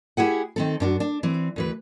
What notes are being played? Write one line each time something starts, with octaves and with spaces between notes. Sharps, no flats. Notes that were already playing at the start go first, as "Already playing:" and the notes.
E4 G4 G#4 F#5
D#3 C4 A4
F#2 D4 F#4
D4
E3 C4
D2 E3 B4